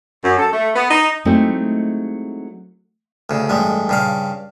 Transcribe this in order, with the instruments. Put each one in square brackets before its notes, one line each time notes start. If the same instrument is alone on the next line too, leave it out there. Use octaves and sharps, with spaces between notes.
[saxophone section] F#2
A4
A3
B3
D#4
[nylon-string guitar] F#3 G#3 A3 C4 D#4 E4
[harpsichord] D2 C#3
A1 G2 G#3
G2 C#3 F5